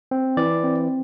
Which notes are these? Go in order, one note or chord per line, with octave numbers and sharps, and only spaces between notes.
C4
E3 D5
C4